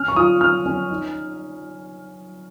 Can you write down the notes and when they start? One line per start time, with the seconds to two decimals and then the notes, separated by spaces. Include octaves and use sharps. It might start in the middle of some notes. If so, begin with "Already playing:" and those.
Already playing: C#4 F6
0.08 C#6
0.16 F4 D#6
0.41 C#4 F6
0.66 C#4
0.90 D#4